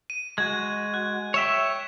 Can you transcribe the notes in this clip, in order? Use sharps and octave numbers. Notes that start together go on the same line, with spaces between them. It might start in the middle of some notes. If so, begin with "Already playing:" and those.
D#7
G#3 F#4 G#6
F#6
C#5 E5 G5 B6 E7 F7